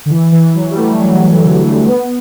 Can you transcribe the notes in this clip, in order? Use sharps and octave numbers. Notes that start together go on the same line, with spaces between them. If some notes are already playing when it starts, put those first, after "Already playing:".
D3
E3
E3
F#3
G3
A3
F#3
E3
D3
A3
B3